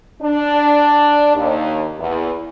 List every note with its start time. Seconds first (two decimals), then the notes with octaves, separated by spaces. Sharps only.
0.21 D4
1.35 D#2
1.99 E2